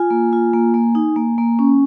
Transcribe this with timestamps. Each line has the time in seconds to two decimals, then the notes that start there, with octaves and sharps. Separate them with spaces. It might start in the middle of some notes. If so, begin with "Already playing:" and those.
Already playing: F4 G#5
0.11 A#3
0.33 F4
0.53 A#3
0.74 A#3
0.95 D#4
1.16 A#3
1.38 A#3
1.59 C#4